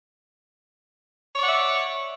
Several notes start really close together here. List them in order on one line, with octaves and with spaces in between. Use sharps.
C#5 D5 F#5 E5